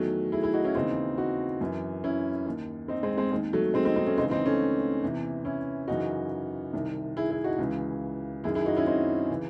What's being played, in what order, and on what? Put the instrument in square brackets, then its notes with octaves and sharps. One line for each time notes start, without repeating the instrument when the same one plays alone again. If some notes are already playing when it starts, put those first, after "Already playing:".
Already playing: [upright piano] E2 D#3 F#3 A3
E4 G#4
E4 G#4
D#4 F#4
C#4 E4
D#2 C#3 E3 C4 D#4
D#4 F#4
F#2 E3
C#4 E4
D#2 D#3
C4 D#4
G#3 C4
G#3 C4
D#2 D#3 G#3
F#3 A3
G#3 C4
C4 D#4
C4 D#4
A3 C#4
C#2 C#3 E3 C4 D#4
C4 D#4
A3 C#4
E2 C3 E3
C#4 E4
F#2 C#3 E3 D#4 F#4
C2 C3 D#3
E4 G#4
E4 G#4
D#4 F#4
C#2 C#3 E3
F#2 D#3 E4 G#4
E4 G#4
D#4 F#4
C#4 E4
C4 D#4
C#3 E3